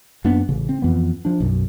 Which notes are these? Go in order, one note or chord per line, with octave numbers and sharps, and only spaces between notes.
F#2 A#3 B3 D4
A1 C#3
C4
F2 E3 B3
F3 D4
B1 F#2